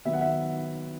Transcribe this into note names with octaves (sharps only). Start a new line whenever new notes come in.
D#3 F#3 B3 D#4 E5
F#5
E5